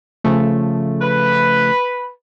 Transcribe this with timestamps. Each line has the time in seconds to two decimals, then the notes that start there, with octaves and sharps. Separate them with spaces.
0.24 C#3 F3 A3
1.02 B4 B5